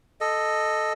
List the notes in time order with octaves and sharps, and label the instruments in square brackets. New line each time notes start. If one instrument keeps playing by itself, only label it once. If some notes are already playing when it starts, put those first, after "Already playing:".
[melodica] A4 D#5